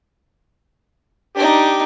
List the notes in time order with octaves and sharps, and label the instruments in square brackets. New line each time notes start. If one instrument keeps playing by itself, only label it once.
[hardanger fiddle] D4 D#4 [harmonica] G4